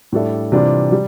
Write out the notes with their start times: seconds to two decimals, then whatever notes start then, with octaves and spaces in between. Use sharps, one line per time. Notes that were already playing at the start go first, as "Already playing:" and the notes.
0.12 A2 G3 D4 A4 E5
0.52 C3 E3 G3 D4 F4
0.92 G3